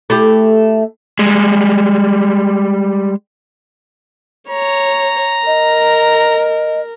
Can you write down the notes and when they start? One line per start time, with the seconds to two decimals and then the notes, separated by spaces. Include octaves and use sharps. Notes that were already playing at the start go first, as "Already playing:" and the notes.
0.10 A3 E4 G4
1.19 G3 G#3
4.49 C#5 A#5
5.47 A#4 D#5